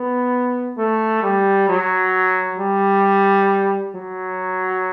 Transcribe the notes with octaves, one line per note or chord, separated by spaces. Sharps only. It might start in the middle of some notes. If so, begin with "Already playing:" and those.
Already playing: B3
A3
G3
F#3
G3
F#3